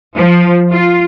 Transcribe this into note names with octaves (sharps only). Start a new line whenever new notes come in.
F3
F4